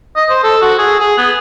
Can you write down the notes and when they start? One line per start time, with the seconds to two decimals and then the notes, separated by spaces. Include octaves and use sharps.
0.16 D#5
0.30 C5
0.44 A4
0.62 F#4
0.79 G#4
1.00 G#4
1.18 B3